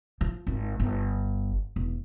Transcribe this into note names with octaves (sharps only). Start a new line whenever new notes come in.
F3
G#1 F4
G1
E1